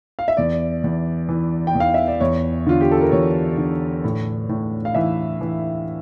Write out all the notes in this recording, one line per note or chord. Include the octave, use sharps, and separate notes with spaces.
F5
E5
E2 D5
E2
E3
G5
E2
F5
E5
D5
E2 C#5
D3 F4
G4
A4
A#4
E2 C#5
D3
A2
A2
F5
E3 E5
E3